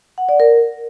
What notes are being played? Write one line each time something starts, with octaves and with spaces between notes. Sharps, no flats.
F#5
D5
A#4